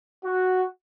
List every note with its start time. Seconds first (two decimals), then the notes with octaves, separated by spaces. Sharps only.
0.24 F#4